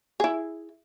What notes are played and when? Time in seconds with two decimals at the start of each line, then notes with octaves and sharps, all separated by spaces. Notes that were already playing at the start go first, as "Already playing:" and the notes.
0.20 E4 G#4